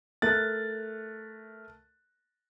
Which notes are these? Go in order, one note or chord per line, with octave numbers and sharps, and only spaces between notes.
A3 A#4 F#6 A6